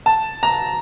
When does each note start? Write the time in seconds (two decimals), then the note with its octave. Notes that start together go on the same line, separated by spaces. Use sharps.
0.06 A5
0.43 A#5